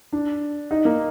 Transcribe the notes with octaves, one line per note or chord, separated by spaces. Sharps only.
D4
D#4
A#3